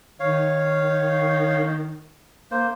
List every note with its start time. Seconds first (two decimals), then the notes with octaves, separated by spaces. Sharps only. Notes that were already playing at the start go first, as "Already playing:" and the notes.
0.20 D#3 C#5 F5
2.51 A#3 C5